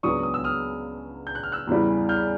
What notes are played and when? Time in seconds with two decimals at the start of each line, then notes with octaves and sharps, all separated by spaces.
0.03 C#2 C#3 F#3 B3 D4 C#6 D#6
0.23 D#6
0.34 E6
0.44 D#6 F6
1.27 G6
1.35 F#6
1.43 F6
1.52 E6 F#6
1.67 E2 C#3 E3 G3
2.09 F6 G6